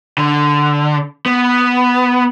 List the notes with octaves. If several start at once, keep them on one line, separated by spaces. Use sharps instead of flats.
D3
B3